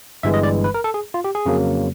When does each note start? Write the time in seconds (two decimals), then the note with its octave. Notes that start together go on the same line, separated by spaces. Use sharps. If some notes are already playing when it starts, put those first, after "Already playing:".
0.23 G1 G2 E3 G#3 E5
0.34 D#5
0.43 D5
0.64 B4
0.74 A#4
0.84 A4
0.94 G#4
1.14 F4
1.24 G4
1.35 G#4
1.46 F2 C#3 F#3 A#3